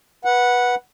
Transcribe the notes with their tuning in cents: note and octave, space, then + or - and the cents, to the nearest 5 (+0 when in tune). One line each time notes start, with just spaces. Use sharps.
B4 -15 F#5 -5